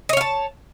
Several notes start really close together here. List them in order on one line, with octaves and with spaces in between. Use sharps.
D#5 C#5 F5 A5